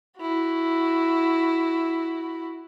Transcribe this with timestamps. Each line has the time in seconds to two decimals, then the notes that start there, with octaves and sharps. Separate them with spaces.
0.19 E4 F#4